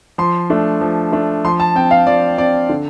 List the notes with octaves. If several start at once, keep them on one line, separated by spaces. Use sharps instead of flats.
F3 C6
A3 D4
F3
A3 D4
F3 C6
A5
C4 G5
F5
F3 D5
C4 D5
D3